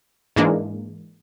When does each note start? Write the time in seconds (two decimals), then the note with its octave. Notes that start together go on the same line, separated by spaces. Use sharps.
0.36 G#2 E3 G#3 A#3 D4